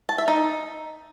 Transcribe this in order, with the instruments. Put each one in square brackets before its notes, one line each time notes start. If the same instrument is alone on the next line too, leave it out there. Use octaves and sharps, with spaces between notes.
[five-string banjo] A5
E5
D#4